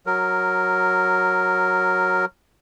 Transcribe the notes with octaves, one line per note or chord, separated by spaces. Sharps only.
F#3 A#4